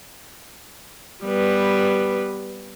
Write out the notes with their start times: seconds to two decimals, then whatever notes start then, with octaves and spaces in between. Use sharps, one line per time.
1.25 G3 B3 B4